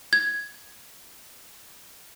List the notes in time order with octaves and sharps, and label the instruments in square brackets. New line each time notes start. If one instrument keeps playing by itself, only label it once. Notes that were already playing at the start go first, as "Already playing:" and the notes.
[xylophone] G#6